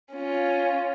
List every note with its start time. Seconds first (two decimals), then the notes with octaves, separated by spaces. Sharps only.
0.13 C#4 F4